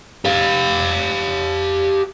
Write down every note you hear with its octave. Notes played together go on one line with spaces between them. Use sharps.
G4 F5